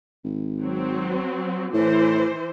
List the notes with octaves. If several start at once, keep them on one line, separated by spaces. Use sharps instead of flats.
G#1
F#3 C4
A2 E3 C5